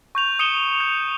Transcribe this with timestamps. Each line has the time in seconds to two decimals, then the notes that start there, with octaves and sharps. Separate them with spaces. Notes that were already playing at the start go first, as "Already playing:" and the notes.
0.15 C#6 G6 F7
0.39 D#6 C#7 D#7 E7 G7
0.80 G6